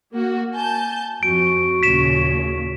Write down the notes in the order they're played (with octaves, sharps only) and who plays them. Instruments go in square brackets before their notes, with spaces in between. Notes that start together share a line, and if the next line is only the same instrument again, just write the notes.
[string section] A#3 F#4
[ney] G#5 [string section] A5 G6
[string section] F2 [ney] F#4 [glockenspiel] D7
[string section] D#2 A#2 C#3 [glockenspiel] B6 E7